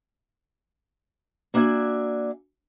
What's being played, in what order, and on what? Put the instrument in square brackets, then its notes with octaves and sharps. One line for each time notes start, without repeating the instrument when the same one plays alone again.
[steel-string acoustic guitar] A#3 D4 F#4 E5 G#5